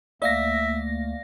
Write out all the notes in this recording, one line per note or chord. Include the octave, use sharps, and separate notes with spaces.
D2 A3 A#3 D5 E5 F5 A#6